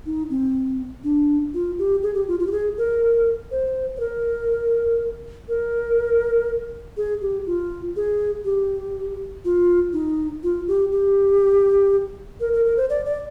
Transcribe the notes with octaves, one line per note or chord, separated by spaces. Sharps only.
D#4
C4
D4
F4
G4
G#4
G4
F4
F4
G4
G#4
A#4
C5
C5
A#4
A#4
G#4
G4
F4
G#4
G4
F4
D#4
F4
G4
G4
A#4
A#4
A#4
C5
D5
D5